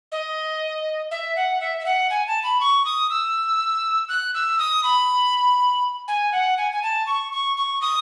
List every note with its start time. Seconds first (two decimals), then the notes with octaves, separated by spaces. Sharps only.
0.12 D#5
1.11 E5
1.36 F#5
1.61 E5
1.80 E5
1.86 F#5
2.10 G#5
2.27 A5
2.43 B5
2.61 C#6
2.85 D#6
3.10 E6
4.09 F#6
4.34 E6
4.59 D#6
4.84 B5
6.08 G#5
6.32 F#5
6.58 G#5
6.72 G#5
6.83 A5
7.07 C#6
7.32 C#6
7.57 C#6
7.81 D#6